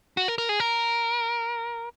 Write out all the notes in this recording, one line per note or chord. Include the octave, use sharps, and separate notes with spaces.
F#4
A#4
A#4
G#4
A#4